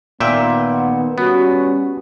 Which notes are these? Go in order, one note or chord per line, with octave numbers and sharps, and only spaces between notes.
A#2 D#3 B3 E5 G5
F#5
G3 B3 C#4 F#4